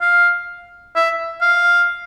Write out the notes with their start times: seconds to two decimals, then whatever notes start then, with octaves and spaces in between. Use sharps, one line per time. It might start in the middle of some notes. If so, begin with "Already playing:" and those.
0.01 F5
0.95 E5
1.41 F5